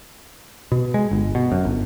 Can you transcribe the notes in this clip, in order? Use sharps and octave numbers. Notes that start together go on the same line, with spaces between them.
B2
G#3
G1
B2
F#2
G1